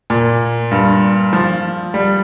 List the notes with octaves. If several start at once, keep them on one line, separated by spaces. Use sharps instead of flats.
A#2
G2
F3
G3